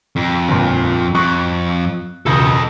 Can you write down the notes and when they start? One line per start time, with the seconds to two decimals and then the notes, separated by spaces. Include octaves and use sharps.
0.16 F2
0.48 G1 A#2
1.14 F2 C#6 F#6
2.26 E1 C#2 A4 D#5